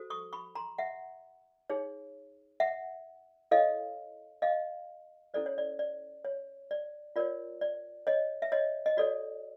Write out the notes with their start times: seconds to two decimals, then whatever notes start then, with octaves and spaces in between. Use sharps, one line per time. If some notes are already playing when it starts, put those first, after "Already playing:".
Already playing: F#4 A4 C5
0.10 C#6 D#6
0.33 B5 C#6
0.55 A#5 C6
0.78 E5 F#5
1.70 D#4 G#4 C#5
2.60 E5 F#5
3.51 E4 A4 C#5 D#5 F5
4.42 D#5 F5
5.34 C#4 E4 A4 C5 D5
5.46 C#5
5.58 D5
5.79 D5
6.25 C#5
6.71 D5
7.16 F4 A#4 C#5 D5
7.61 D5
8.07 C#5 D#5
8.42 E5
8.52 C#5 D#5
8.86 D#5
8.97 F#4 A4 C#5 D5